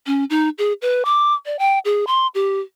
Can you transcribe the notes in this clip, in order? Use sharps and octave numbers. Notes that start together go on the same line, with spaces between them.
C#4
D#4
G#4
B4
D6
D5
G5
G#4
C6
G4